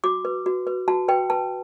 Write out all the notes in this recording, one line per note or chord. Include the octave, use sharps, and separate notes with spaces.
F#4 D6
B4
F#4
B4
F#4 A5
B4 G5
B4 A5